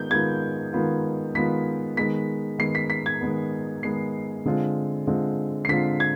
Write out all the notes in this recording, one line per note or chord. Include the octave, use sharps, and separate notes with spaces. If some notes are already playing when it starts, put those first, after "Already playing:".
Already playing: D#3 G#3 B3 F4 G6
D#3 G#3 B3 F4 G#6
D#3 G#3 B3 F4
D#3 G#3 B3 F4 B6
D#3 G#3 B3 B6
D#3 G#3 B3 C7
B6
B6
G#6
D#3 G#3 B3
D#3 G#3 B3 C7
D3 G#3 C4 F4
D3 G#3 C4 F4
C7
D3 G#3 C4 F4 B6
G#6